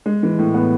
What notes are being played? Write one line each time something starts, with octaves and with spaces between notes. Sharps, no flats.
G#3
E3
A2
B3